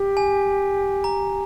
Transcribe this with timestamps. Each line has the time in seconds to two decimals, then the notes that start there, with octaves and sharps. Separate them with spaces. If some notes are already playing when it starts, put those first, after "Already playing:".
Already playing: G4
0.17 G#5
1.04 A#5